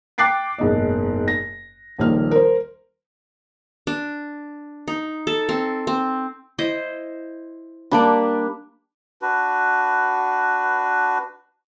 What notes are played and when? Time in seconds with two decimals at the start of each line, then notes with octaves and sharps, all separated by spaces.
0.18 G5 D6 F#6 A6 C7 D7
0.58 F#1 G#2 B2 D#5
1.28 A#6
1.98 D#1 A#1 A#3 D#4 F6
2.31 A#4 C5
3.87 D4
4.88 D#4
5.27 A4
5.49 C4
5.87 C4
6.58 E4 C5 D#5
7.91 G3 A#3 D4 D5 B5
9.22 D4 F#4 B4